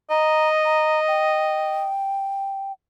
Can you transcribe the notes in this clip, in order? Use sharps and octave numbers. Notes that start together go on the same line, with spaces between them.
D#5 A#5
A#5
G5